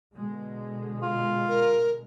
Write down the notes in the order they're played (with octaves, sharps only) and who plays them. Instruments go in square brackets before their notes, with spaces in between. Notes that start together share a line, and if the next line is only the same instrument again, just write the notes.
[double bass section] B2 D3 G#3
[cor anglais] F4
[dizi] A#4